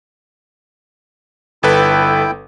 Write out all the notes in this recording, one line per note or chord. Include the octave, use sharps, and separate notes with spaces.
G1 E4 A4 B4 G5